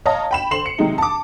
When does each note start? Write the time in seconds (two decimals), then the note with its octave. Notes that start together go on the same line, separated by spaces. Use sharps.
0.06 C#5 D#5 F5 A5 A#5
0.31 G5 B5 E7
0.51 D3 C5 C6 C7 E7 F#7
0.66 C#7
0.78 C3 D#3 F#3 G#3 D#4
0.98 A5 D6